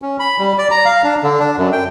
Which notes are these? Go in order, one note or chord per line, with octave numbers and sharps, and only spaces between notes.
C#4
B5
G3
D5
A#5
F5
D4
D3
D4
F#2
G5